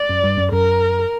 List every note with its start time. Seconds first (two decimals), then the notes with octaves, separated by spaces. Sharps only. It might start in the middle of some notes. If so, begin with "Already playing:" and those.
Already playing: D5
0.09 F#2
0.24 G2
0.37 F#2
0.52 F#2 A#4